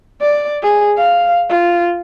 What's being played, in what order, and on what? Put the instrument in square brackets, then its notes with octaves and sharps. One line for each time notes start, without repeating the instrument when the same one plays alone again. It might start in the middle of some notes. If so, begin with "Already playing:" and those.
[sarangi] D5
G#4
F5
F4